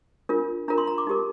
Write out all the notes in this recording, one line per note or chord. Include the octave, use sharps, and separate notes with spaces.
D4 F4 A#4
D4 F4 A#4 A#5
C6
A#5
D6
D#4 G4 A#4